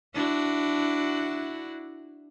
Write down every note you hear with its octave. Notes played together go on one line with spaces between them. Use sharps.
D4 E4 F#4